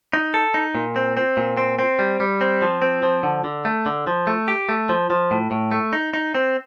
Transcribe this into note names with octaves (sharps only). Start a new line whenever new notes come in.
D#4
A4
D#4
A#2
C4
C4
A#2
C4
C4
G3
G3
C4
F3
C4
F3
D3
D3
A3
D3
F3
A3
G4
A3
F3
F3
A2
A2
A3
D#4
D#4
C4